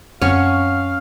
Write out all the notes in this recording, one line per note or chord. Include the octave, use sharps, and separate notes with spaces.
F#2 C4 C#4 F5 F#5 A5 C#6